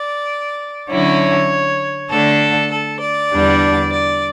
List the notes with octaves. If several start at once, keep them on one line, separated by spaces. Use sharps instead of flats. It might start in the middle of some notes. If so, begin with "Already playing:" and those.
Already playing: D5
D3 F#3 C#4 E4 C#5
D3 A3 D4 A4
A4
D5
E2 D3 G3 D4
D5